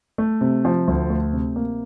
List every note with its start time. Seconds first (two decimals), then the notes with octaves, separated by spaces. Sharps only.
0.18 A3
0.41 C3
0.65 F3
0.87 D2
1.09 A3
1.33 C3
1.56 A#3